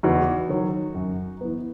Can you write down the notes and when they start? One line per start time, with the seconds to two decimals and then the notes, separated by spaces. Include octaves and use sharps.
0.03 E2 D#4 F#4
0.49 D#3 F#3
0.94 F#2
1.41 E3 B3